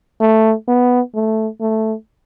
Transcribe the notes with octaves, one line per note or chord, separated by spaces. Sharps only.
A3
B3
A3
A3